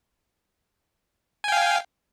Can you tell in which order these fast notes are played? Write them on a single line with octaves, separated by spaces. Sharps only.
G#5 G5 F5